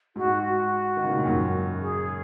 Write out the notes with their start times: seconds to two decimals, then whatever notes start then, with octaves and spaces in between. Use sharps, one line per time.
0.16 G#2 F#4
0.43 F#4
0.97 D#3
1.04 C#3
1.11 A#2
1.19 G#2
1.26 F#2
1.81 G#4